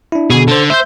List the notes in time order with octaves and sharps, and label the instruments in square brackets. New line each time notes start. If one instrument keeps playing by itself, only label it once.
[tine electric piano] D4 E4
[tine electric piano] B2 D3 [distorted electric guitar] G#4
[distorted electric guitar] D3 [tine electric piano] A4 C5
[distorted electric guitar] C5 [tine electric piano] E5 G6